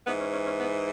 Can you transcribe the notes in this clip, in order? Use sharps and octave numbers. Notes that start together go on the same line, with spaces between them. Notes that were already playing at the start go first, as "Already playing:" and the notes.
G#2 E3 B3
C#4
C#4
C#4
B3